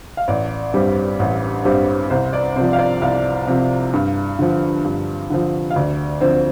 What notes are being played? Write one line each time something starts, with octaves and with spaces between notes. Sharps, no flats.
F5
A1 D5
G2 G3 C4
A1
G2 G3 C4
C2 C5
D5
C3 F3 C5
F5
D5
C2 F5
C3 F3
G2
D3 F3
G2
D3 F3
F5
D2 D5
D3 F3 C4